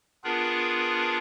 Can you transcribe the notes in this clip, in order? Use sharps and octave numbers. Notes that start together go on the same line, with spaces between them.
B3 D4 F4 G#4 A#4 B4